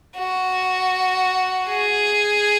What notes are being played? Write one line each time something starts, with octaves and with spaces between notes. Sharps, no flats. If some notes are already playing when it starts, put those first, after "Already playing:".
F#4
G#4